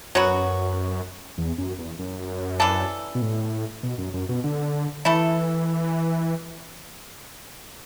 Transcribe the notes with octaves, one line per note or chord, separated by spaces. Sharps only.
F#2 F#3 B3 F#4
E2
F#2
E2
F#2
E3 D4 A4
B2
A2
B2
F#2
F#2
B2
D3
E3 A3 E4 A4